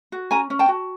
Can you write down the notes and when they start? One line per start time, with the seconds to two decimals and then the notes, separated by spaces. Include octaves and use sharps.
0.12 F#4
0.31 C#4 G#5 A#5
0.50 C#4
0.59 G5 A5
0.68 F#4